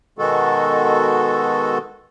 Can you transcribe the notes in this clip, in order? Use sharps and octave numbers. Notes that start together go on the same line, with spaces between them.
B2 D#3 G#3 F#4 A4